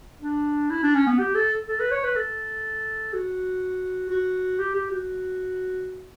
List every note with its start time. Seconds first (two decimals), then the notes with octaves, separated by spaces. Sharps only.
0.22 D4
0.71 E4
0.83 D4
0.95 C#4
1.07 B3
1.19 G4
1.35 A4
1.68 A4
1.80 B4
1.91 C#5
2.04 B4
2.16 A4
3.13 F#4
4.10 F#4
4.59 G4
4.75 G4
4.91 F#4